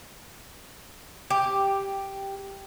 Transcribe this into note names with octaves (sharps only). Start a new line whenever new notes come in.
G4